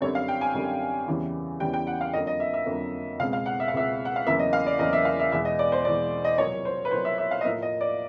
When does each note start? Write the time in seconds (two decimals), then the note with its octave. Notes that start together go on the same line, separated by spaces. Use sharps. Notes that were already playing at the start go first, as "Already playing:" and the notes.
0.01 F#2 D3 G3 C4 C#5
0.15 F5
0.28 G5
0.41 G#5
0.54 F#2 D3 G3 C4
1.08 E2 C#3 E3 G3 B3
1.60 E2 C#3 E3 G3 B3 G5
1.74 G5
1.87 F#5
2.01 F5
2.13 F2 D3 F#3 A#3 D#5
2.27 D#5
2.40 E5
2.54 E5
2.66 F2 D3 F#3 A#3
3.19 C#2 B2 G#3 C4 F5
3.33 F5
3.46 F#5
3.60 E5
3.68 F5
3.73 C#2 B2 G#3 C4 E5
4.05 F#5
4.16 F5
4.27 E2 C#3 F#3 A#3 E5
4.39 D#5
4.53 F5
4.66 D5
4.79 E2 C#3 F#3 A#3 D#5
4.93 E5
5.05 F5
5.20 E5
5.32 E2 B2 G#3 B3 E5
5.45 D#5
5.59 D5
5.72 C5
5.85 E2 B2 G#3 B3 D5
6.25 D#5
6.38 C2 A#2 F#3 C#5
6.65 C5
6.85 B4
6.91 C2 A#2 F#3 C5
7.05 E5
7.18 E5
7.31 F5
7.41 D#5
7.44 A2 F3 A#3 E5
7.62 D#5
7.81 D5